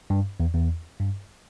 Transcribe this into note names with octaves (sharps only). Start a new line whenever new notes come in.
G2
E2
E2
G2